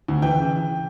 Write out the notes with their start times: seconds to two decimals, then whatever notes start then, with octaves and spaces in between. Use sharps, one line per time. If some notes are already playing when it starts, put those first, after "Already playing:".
0.08 D2
0.22 E3 G5
0.37 C#3